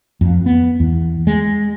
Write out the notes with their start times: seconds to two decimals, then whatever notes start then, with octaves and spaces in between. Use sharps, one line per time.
0.21 F2
0.46 B3
0.80 E2
1.27 G#3